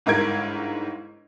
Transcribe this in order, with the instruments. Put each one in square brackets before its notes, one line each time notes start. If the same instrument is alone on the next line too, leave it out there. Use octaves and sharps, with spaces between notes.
[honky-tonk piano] G1 G#2 E4 A#4 G#6 D7